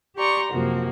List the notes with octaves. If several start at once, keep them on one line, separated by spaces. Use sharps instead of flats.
G4 D5 A#5 C6 C#6
F#2 C3 F3 A#3 F#4